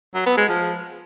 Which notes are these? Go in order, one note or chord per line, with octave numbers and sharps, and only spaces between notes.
F#3
B3
G#3
F3